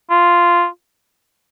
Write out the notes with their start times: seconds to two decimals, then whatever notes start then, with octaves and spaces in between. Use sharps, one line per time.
0.10 F4